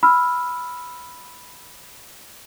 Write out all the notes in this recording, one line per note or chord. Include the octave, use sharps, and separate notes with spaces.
B5 E6 F6